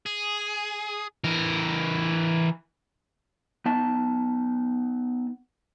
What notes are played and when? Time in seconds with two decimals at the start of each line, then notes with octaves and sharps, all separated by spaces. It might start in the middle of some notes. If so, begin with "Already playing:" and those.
0.06 G#4
1.24 E3 A#4
3.66 B3 D#4 A5